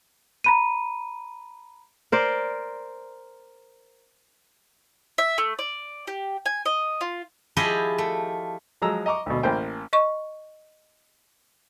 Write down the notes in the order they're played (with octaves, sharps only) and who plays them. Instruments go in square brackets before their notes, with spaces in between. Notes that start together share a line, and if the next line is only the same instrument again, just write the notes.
[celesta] A#5 B5 D#7
[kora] A#4 C5 D5
[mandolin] E5
A3
D5
G4
G#5
D#5
F4
[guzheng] F3 E4 F4 G4 G#4 D#5
A3
[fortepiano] F3 F#3 G#3 A#5 E6
D#5 A#5 C#6 D6
D2 B2
A1 A#3 C5 G5 B5
[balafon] D#5 C#6